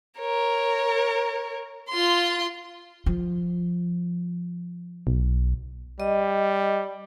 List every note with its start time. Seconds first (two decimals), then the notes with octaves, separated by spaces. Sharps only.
0.20 A#4 C#5
1.89 F4 C6
3.06 F3
5.07 B1
6.00 G3 D#5